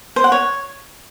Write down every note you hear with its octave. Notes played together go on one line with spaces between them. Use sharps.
C5
F#5
C#5